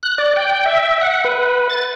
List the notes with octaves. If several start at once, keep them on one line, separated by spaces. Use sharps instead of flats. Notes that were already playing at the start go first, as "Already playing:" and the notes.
F#6
D5
G5
E5
F#5
B4
A6